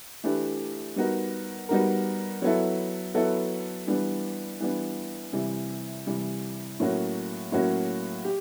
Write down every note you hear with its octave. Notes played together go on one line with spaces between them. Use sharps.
E3 A3 D4 G4 B4
G3 B3 D#4 F#4 A#4
G3 B3 D#4 F#4 A#4
F#3 B3 E4 A4
F#3 B3 E4 A4
E3 G3 B3 D4
E3 G3 B3 D4
C3 E3 G3
C3 E3 G3
A2 F#3 A#3 C#4 F#4
A2 F#3 A#3 C#4 F#4
G4